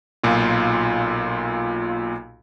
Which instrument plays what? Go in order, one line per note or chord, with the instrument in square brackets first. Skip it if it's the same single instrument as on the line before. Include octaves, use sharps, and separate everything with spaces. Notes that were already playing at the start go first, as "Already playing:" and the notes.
[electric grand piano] B1 A#2 F4